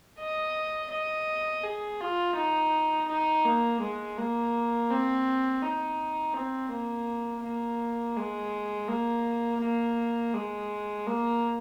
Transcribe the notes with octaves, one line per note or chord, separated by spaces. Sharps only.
D#5
D#5
G#4
F4
D#4
D#4
A#3
G#3
A#3
C4
D#4
C4
A#3
A#3
G#3
A#3
A#3
G#3
A#3